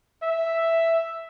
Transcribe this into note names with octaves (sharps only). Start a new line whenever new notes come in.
E5